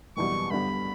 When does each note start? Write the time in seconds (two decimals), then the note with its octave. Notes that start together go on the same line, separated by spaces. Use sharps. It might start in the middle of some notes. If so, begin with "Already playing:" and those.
0.17 F#1 E2 B2 G3 C#6
0.51 G2 D3 G3 B3 B5